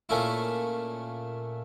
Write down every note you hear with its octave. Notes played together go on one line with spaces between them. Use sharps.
A#2 A3 C#4 E4